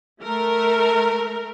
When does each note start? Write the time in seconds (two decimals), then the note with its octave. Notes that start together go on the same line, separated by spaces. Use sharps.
0.22 A3 A#4